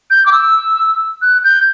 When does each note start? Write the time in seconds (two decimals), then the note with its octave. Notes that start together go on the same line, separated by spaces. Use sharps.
0.10 G6
0.26 D6
0.32 E6
1.22 F#6
1.44 G6